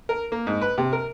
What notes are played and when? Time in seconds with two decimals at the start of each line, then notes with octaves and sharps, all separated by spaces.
0.09 A#4
0.32 A#3
0.47 G#2
0.61 B4
0.78 C3
0.93 A#4